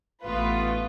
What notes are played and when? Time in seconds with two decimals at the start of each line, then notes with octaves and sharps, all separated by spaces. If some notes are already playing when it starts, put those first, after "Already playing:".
0.24 A1 A3 B3 F4 B4